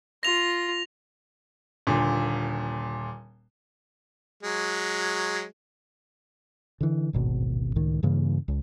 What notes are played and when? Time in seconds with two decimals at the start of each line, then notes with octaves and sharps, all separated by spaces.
0.23 F4 A#6 F7
1.87 D#1 A#2 D3
4.43 F#3 G#3
6.81 D3 E3
7.13 D1 G#1 B2
7.76 C#2 A2 D#3
8.03 G2 C#3 E3 A#3
8.48 C#2